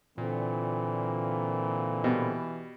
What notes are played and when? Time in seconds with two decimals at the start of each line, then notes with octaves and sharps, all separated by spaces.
0.18 A#2 D3 E3 C4
2.04 B2 G3